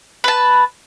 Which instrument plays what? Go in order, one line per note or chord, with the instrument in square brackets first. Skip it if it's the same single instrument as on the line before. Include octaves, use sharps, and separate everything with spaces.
[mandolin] B4 A5